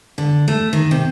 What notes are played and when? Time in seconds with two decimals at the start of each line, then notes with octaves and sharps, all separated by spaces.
0.18 D3
0.48 A3
0.73 D#3
0.91 C3